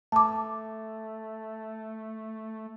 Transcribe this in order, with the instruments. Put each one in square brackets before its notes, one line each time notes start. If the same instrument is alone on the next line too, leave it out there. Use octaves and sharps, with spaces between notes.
[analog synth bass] A3 [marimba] A5 D6